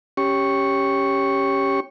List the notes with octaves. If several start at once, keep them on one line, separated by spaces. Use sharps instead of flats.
C#4 G4 C#6